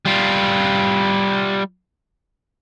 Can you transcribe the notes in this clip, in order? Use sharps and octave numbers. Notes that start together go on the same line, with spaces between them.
G3 F4